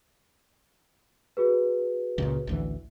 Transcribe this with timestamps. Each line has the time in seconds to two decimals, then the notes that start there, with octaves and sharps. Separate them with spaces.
1.37 F#4 G#4 B4
2.18 C#2 A#2 C#3
2.47 A1 D2 E3